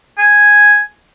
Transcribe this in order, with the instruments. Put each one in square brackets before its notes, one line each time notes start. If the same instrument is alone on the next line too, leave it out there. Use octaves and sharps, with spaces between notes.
[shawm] G#5